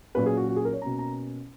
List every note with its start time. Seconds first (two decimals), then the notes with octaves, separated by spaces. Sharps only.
0.15 A#2 F#3 C#4 B4
0.26 G#4
0.37 F#4
0.48 F#4
0.56 G#4
0.65 A#4
0.73 C#5
0.82 B2 A#3 C#4 A#5
0.99 A#5